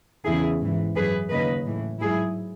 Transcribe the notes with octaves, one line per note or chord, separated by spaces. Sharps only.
E2 C#3 E3 E4 G#4
G#2 E3
F#2 E3 G#4 B4
D#2 C#3 F#3 B4 D#5
A2 E3
G#2 F#3 E4 G#4